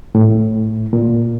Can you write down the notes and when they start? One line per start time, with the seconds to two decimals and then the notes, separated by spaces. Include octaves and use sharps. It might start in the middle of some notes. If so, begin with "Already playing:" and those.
0.15 A2
0.93 A#2